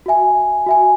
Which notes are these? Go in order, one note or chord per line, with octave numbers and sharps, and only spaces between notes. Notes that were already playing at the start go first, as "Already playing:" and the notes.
F#4 E5 G#5
F#4 E5 G#5